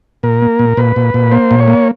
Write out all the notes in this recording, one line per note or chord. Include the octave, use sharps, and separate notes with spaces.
A#2 A#4
A#3
A#2
A#2 B4
A#2
A#2
A#3 C5
A#2
C#5
A#3